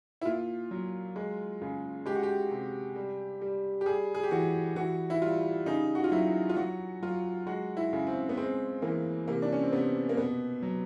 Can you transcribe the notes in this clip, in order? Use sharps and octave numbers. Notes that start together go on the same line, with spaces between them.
E4
A#2 F4
F#3
G#3
C#3
G#3 G4
F#4
G4
C3
G3
G3
G4
G3 G#4
G#4
G4
E3 F#4
E3 F#4
E4
G3 F4
C#3 D#4
F#4
F4
F#3 E4
F4
F#3 F#4
F#3 F4
G#3 F#4
E4
C#3
C4
B3
G#3 C4
E3 A#3
C3 A#3
D4
C#4
C4
C3 B3
A#3
B2 B3
F#3